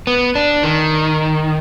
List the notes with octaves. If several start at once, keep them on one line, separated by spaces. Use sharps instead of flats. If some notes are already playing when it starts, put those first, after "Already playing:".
B3
D4
D#3